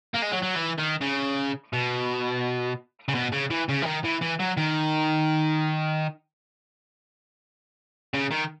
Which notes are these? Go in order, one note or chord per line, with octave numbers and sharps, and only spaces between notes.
A#3
G#3
F#3
F#3
E3
D#3
C#3
B2
C#3
B2
C#3
E3
C#3
E3
D#3
E3
E3
F#3
D#3
C#3
D#3